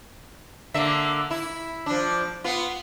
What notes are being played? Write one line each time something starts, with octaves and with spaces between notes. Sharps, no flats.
D3 A#3 E5
E4
F3 D4
B3 F4